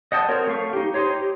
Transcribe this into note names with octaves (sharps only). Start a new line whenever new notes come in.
D#5 F#5 G5 A5 D#6
C4 F#4 A#4 C5 C#5
A3 F5 C#6
D#4 G4
D#4 G4 C5 C#5
G4